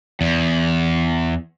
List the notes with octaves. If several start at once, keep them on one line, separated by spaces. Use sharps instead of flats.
E2